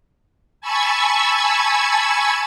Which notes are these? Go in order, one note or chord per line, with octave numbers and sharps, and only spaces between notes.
G#5 A5 B5 C#6 E6 G#6